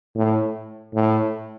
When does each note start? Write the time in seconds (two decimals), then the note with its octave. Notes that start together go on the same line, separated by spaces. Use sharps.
0.15 A2
0.94 A2